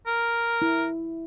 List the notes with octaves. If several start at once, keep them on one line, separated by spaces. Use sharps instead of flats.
A#4
E4